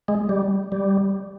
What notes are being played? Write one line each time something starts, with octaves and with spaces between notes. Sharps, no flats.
G#3
G3
G3